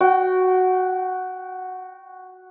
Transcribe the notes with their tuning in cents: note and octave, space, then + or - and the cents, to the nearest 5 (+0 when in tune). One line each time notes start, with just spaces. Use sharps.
F#4 +0 G5 -30